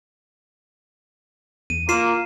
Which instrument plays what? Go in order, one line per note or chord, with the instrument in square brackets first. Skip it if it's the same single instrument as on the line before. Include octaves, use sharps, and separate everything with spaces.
[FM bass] E2 [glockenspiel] D#7
[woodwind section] A#3 [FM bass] F4 [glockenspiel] C7 D#7 E7